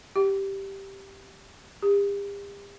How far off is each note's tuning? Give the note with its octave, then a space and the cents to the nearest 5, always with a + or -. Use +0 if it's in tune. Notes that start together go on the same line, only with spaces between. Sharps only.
G4 -5
G4 +40